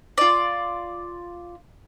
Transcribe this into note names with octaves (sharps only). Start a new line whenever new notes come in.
F4 D5